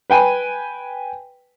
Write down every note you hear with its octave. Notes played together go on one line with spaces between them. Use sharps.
B4 G5 G#5 B5